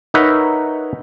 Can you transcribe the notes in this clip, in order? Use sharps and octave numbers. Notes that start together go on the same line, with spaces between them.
D#4 A#4 B4 C#5 E5 F#5